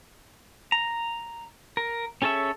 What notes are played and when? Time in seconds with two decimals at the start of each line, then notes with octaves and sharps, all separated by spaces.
0.72 A#5
1.77 A#4
2.22 C#4 G#4 A4 C#5 E5